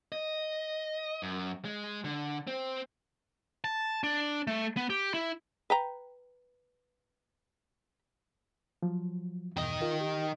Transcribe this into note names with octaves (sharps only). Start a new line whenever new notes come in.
D#5
F#2
G#3
D3
C4
A5
D4
A3
B3
G4
E4
B4 G5 A#5
F3 F#3
E2 G2 B2 D#3 D#5
F4 A#4
G4